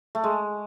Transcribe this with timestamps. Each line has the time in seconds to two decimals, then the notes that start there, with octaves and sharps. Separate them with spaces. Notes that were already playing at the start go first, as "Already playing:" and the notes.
0.15 A3
0.24 G#3